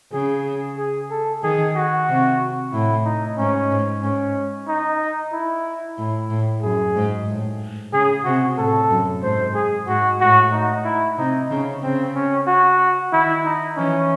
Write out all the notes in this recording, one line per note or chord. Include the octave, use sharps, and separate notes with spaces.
C#3 G#4
G#4
A4
D#3 G#4
F#4
C3
A2 E4
D#4
G#2 C#4
G#2
G#2 C#4
D#4
E4
A2 E4
A2
F#2 G#4
G#2
A2
C#3 G#4
C3 F#4
A2 A4
F#2
G#2 C5
G#4
G#2 F#4
A2 F#4
D#4
E4
C3 D#4
C#3 C#4
C#3 C4
C#4
F#4
D#3 E4
D#4
E3 C#4